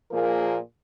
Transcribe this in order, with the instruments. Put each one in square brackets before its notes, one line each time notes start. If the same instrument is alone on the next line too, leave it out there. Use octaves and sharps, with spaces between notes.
[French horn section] A#2 F3 A#3 G#4 A#4